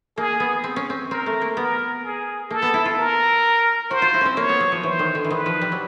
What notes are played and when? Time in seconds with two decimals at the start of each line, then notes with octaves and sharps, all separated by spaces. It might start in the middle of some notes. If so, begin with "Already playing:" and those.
0.17 A#3 G#4
0.40 B3
0.64 C4
0.76 C#4
0.90 C4
1.11 C4 A#4
1.26 A3
1.42 A#3
1.57 B3 A#4
2.04 G#4
2.51 A#3 A4
2.62 B3
2.74 E4
2.86 F4
2.97 A#4
3.91 F#4 C5
4.02 F4
4.14 E4
4.21 C4 C#4
4.37 A#3 C#5
4.49 B3
4.60 F#3
4.72 F3
4.83 E3 C5
4.99 D#3
5.15 D3
5.25 E3
5.31 D#3 B4
5.46 F3
5.61 G3
5.72 F#3